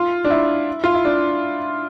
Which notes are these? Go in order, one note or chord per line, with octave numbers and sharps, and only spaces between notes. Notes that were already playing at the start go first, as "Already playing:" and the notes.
Already playing: F4
D4
E4
F4
E4
D4